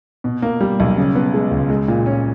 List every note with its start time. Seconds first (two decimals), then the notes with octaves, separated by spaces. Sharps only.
0.24 B2
0.42 A#3
0.61 G3
0.80 B1
0.98 C#3
1.15 B3
1.34 G#3
1.51 C#2
1.69 G#3
1.88 A#2
2.06 C#4